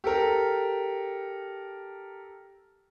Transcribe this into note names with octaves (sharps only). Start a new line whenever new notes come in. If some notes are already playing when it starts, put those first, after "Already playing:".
G4 A4 A#4